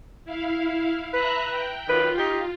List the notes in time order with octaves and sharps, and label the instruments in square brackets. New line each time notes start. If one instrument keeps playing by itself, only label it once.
[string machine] E4 F5
[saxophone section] B4 [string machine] E5 A#5 F#6
[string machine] G5
[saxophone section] F#2 D#3 B4 [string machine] F4
[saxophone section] D#4 G4